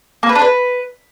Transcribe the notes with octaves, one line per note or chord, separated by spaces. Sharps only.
A#3
B4
D4
B4